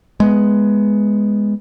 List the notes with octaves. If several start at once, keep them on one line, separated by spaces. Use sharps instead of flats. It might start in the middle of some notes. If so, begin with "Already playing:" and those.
G#3 B3